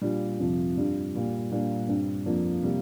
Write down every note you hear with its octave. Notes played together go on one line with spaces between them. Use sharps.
A#2 G3 D4 F4
F2 C3 F3
G2 G3 D4 F4
A#2 G3 A#3
A#2 G3 A#3 D4 F4
G2 G3 C4
F2 F3 A#3 D4
C3 G3 A#3